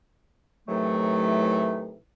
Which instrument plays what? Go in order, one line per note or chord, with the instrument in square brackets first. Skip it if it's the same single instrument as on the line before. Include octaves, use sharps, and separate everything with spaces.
[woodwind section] A2 C3 D#3 E3 F#3 A3